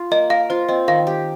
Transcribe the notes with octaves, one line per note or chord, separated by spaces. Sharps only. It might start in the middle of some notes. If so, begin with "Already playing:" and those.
Already playing: F4
A#3 D#5
A#4 F5
F4 C5
C4 D#5
D#3 F5
G4